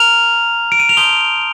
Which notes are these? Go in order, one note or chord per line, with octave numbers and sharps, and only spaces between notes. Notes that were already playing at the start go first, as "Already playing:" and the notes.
Already playing: A#5 F6 F7
D7
D#7
F7
A5 C6 D#6 G6 G7